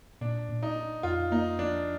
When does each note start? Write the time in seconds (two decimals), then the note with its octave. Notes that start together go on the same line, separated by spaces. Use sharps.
0.21 A#2 D4
0.49 A#2
0.63 D#4
0.76 D#4
1.03 F2 F4
1.32 A#3 D#4
1.59 F3 D4